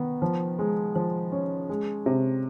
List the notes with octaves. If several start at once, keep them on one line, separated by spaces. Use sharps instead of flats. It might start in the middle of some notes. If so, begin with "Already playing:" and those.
Already playing: D#3 B3
F3
G#3
F3
C#4
G#3
C3